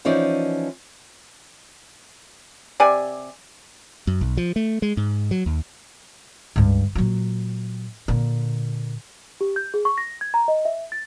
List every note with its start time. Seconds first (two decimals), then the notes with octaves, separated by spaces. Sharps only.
0.05 E3 F3 C#4 D#4 D5
2.80 C3 G4 D5 G#5
4.07 F#2
4.21 B1
4.37 F3
4.56 A3
4.82 G#3
4.97 G#2
5.31 F#3
5.46 D#2
6.56 C#2 G2
6.95 A#2 F#3
8.08 A#2 D3
9.41 G4
9.56 G6
9.74 G#4
9.85 C#6
9.98 A#6
10.21 G#6
10.34 A#5
10.48 D#5
10.65 E5
10.92 A6